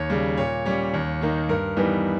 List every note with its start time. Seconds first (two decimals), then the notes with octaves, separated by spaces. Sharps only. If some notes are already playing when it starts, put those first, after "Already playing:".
Already playing: D#2 C#5
0.10 C#3 G3
0.37 A#2 C#5
0.65 G3 C#4
0.93 D#2
1.21 D#3 A#3 D#4
1.49 G2 A#4
1.77 E3 G3 B3 D#4